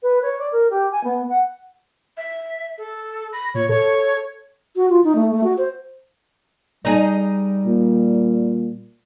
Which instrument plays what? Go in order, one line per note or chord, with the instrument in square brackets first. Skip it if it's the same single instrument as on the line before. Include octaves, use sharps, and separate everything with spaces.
[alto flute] B4
C#5
D5
A#4
G4
G#5
B3
F#5
[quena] E5
A4
[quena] B5 [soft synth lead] A#6
[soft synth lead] A#2 [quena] C#5
[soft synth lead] A4 [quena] C#5
[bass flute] F#4
F4
D#4
A3
A3
F#4
C5
[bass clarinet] G3 [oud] D#4 G#4
[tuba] A#2